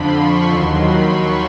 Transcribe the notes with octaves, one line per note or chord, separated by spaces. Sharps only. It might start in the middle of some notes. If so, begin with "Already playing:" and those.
Already playing: F2 D3 F3 B5 C6
C#6
D#2 D#3 F#3 C6
B5
C#6